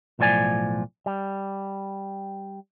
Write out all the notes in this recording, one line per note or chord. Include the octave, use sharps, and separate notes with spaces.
B1 A2 F3 D5 G#5
G3